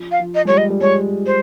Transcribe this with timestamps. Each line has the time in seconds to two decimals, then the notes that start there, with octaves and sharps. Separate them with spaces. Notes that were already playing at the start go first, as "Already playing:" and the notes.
Already playing: F3
0.12 F5
0.20 F3
0.35 D#5
0.45 G3 G#3 C#5
0.58 D#5
0.70 G3
0.81 G#3 C#5
1.26 C5